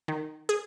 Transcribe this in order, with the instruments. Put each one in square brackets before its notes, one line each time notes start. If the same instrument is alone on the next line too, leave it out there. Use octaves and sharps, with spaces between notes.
[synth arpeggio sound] D#3
G#4